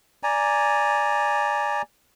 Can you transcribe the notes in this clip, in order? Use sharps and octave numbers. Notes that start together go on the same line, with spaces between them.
D5 G#5 A#5